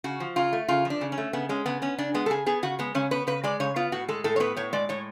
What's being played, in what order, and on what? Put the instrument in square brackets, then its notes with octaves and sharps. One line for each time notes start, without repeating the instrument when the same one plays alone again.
[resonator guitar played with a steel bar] C#3 F#4
F3
C#3 F4
A3
C#3 F4
F3
D4
C#3
C#4
A3
C#3 B3
G#3 C#4
C#3 B3
B3 C#4
C#3 D4
G#3 B3
A4
C#3 G#4
B3 G#4
C#3 F#4
G#3 B3
C#3 C#4
B3 B4
C#3 B4
G#3 D5
C#3 C#5
B3 F4
A2 F#4
G#3 A4
A2 A4
C#5
B3 B4
A2 C#5
G#3 D5
A2 C#5